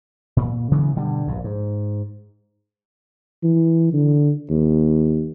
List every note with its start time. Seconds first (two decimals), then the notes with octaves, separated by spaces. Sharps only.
0.37 A#2
0.71 C#3 E3 F#3 B3
0.95 G2 B2 D3 G3
1.28 A#1 G2
1.44 G#2
3.43 E3
3.93 D3
4.50 D#2